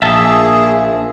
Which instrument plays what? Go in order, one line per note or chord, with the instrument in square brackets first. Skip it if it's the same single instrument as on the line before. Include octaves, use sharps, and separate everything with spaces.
[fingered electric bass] A#1 [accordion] A#3 G#4 [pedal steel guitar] E5 A5